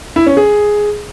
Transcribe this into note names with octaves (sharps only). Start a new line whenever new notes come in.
E4
C#4
G#4